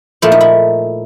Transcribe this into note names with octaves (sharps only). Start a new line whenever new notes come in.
A#2 F3 A3 E4
D#4
E4